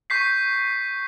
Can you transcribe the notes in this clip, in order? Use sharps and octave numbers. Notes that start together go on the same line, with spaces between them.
C#6 G6 B6 C7